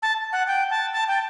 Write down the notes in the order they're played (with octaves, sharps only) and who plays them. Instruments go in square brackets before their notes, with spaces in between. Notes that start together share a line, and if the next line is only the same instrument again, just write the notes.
[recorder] A5
F#5
G5
A5
A5
G5